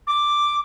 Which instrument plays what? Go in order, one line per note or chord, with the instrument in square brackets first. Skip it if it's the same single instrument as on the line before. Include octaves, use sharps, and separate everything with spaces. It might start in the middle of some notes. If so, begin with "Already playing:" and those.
[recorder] D6